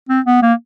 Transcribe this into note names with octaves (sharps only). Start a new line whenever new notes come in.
C4
B3
A#3